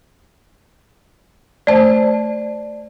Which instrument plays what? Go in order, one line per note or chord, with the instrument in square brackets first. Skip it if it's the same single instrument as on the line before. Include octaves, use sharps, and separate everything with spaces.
[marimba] A3 C5 [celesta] D5 A5